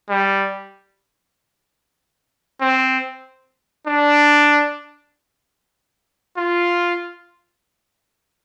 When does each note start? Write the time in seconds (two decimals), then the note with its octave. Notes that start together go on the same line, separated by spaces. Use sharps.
0.10 G3
2.61 C4
3.87 D4
6.37 F4